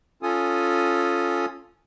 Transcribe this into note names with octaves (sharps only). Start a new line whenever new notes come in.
C#4 F4 A4 G#5 D#6